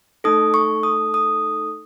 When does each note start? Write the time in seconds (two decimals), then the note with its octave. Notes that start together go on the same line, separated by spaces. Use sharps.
0.24 A3 D#4 A4 D#6
0.54 C#6
0.83 D#6
1.14 D#6